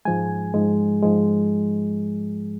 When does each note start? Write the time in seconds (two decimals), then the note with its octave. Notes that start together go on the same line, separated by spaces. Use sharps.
0.05 G#2 F3 G#3 G#5
0.54 G#2 F3 G#3
1.03 G#2 F3 G#3